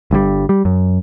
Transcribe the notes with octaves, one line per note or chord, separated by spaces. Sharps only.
G1 G2 B2 G3
G3
F#2